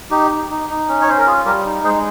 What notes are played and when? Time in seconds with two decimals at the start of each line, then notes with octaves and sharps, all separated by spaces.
0.11 D#4 G4
0.31 D#4
0.50 D#4
0.70 D#4
0.88 C#4
1.01 C#5
1.07 C#4 C5
1.18 A#4
1.26 F4 G#4
1.45 G3 G4 A#4
1.65 D#4
1.84 G#3 G#4 C5